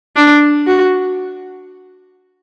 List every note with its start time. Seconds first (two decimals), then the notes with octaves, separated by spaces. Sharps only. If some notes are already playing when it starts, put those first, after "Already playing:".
0.16 D4
0.67 F#4